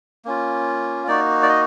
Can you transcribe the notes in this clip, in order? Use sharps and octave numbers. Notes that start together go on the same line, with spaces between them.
A#3 C#4 F4
A#3 D#4 F#4 D5
D5
D#5